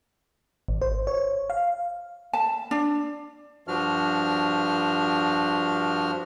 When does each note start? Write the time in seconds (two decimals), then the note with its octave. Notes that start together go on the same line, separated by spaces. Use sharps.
0.68 G#1
0.82 C5
1.07 C#5
1.50 F5
2.33 A5
2.71 D4
3.68 G2 F3 D4 F#4 F6